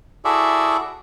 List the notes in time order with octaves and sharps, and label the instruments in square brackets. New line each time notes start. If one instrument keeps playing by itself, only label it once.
[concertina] E4 F#4 G#4 A4 D5 E5